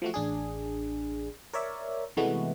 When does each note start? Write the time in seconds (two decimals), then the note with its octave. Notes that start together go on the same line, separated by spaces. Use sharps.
0.02 F3 A3 F#4
0.14 A1 D4 G#4
1.53 A#4 C#5 D5 E5
2.17 C3 E3 G#3 A3 B3 F#4